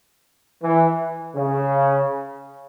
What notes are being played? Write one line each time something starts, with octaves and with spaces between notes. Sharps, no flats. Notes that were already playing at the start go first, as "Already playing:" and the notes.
E3
C#3